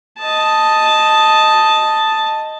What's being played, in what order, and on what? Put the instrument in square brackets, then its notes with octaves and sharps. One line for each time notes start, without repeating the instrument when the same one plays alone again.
[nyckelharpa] D#5 A5